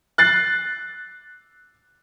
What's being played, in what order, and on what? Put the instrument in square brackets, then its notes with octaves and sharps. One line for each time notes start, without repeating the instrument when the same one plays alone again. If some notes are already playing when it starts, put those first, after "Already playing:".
[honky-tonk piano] F#6 A6 C7